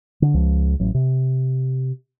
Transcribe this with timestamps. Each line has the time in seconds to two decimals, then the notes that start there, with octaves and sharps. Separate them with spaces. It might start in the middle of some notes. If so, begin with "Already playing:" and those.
0.22 D3
0.34 C#2 F3
0.80 A1 F#3
0.94 C3